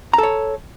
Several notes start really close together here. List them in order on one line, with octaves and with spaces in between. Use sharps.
A#5 A4 C#5